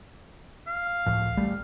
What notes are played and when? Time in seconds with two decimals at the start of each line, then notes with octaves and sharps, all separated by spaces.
0.67 F5
1.06 C#2 A2 F3
1.37 A1 G3 A3